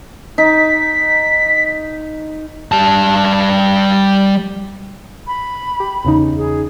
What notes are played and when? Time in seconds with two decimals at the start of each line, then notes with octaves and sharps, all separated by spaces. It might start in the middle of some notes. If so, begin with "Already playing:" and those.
0.38 D#4 B6
2.72 G3 A5
5.27 B5
5.80 G4
6.04 E2 C#3 D#4
6.37 G#4